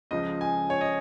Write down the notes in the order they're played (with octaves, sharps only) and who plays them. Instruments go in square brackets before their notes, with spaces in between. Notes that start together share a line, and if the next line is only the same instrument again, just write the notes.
[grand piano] C#2 C#3 F3 D#5
G#5
C#5
D#5